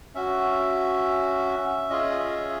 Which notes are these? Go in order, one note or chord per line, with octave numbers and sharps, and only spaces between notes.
C#4 F#4 E5
C#4 F4 G#4 D#5
E5